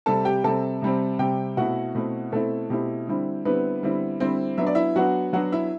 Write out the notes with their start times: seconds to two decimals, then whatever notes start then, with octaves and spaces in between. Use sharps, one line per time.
0.06 C3 G3 C4 A4 A5
0.25 G4 G5
0.44 C3 G3 C4 A4 A5
0.82 C3 G3 C4
1.19 C3 G3 C4 G4 G5
1.57 B2 A3 C4 E4 F#4 F#5
1.95 B2 A3 C4 E4
2.32 B2 A3 C4 E4 A4
2.70 B2 A3 C4 E4 G4
3.07 D3 G3 C4 E4
3.45 D3 G3 B3 C4 E4 B4
3.83 D3 G3 C4 E4
4.20 D3 G3 C4 E4 C5
4.58 F#3 B3 D4 E5
4.67 D5
4.75 E4 E5
4.96 F#3 B3 D4 F#4 F#5
5.33 F#3 B3 D4 F#4 F#5
5.52 E4 E5